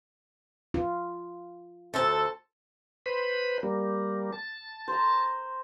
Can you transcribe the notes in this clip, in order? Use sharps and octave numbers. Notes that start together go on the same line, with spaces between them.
F4
D2 A4 C5 A5
B4 C5 B5
G3 A#3
A5
C5 A#5